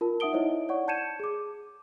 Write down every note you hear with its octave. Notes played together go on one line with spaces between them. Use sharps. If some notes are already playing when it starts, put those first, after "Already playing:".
F4 A#4 A5
D#4 E5 F#5 D#6 D7 G7
D#4 E4 C5 C#5 D#5 E5
C#5 D5 F#5 C#6
A5 G6 G#6 C#7 D#7 E7
G#4 D6